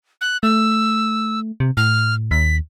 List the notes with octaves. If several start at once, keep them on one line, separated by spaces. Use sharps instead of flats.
F#6
A3 E6
C3
A2 F6
D#2 B6